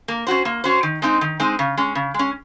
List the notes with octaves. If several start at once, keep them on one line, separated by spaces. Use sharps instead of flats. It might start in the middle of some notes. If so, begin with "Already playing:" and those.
A#3
C#4 F#4 C5
A#3
C#4 F#4 C5
D#3
G#3 C4 D#4
D#3
G#3 C4 D#4
C#3
G#3 C#4
C#3
G#3 C#4